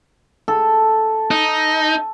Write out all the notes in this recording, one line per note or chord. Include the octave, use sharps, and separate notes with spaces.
A4
D#4